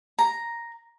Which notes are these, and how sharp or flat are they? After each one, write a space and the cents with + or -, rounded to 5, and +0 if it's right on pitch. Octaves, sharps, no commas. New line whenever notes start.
A#5 +0